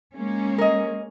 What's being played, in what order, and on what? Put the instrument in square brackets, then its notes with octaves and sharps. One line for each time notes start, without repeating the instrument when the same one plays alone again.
[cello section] G#3 A#3 C#4
[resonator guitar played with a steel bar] A#4 D#5